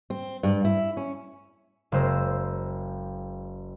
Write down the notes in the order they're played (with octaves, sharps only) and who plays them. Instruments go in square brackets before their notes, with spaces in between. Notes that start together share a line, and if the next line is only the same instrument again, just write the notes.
[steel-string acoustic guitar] C4
G2
E4
C#4
[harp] F#1 G#3 C5 E6